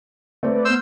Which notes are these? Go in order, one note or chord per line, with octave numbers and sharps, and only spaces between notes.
A3 C4 B4 D5
B3 C5 E6 F6